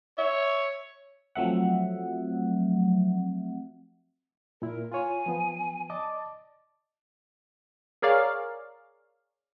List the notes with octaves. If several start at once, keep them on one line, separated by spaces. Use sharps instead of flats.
C#5 E5
F3 F#3 A3 C4 E5 F#5
A#2 E4 A#4
F4 C#5 G#5
F3 B3
D5 D#5 A5 D6
G#4 A#4 C#5 D5 F5